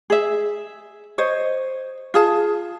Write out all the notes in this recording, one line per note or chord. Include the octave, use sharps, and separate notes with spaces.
G#4 E5
C5 C#5 D#5
F4 G#4 A5